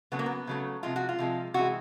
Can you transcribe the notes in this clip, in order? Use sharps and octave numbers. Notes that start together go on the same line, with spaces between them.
C#3 F#3 A3 B3
A#3
B3
C#3 F#3 A3
C3 F3 G#3 F4
F#4
F4
C3 F3 G#3
C3 E3 G#3 F#4